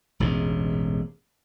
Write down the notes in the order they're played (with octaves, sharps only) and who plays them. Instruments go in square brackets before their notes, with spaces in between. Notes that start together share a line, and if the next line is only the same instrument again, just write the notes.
[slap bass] E1 A1 E2 G#2